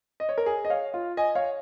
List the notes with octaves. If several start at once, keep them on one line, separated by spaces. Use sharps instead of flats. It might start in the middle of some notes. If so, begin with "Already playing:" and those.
D#5
C#5
A#4
G#4
D#5
C#5 F5
F4
D#5 G#5
C#5 F5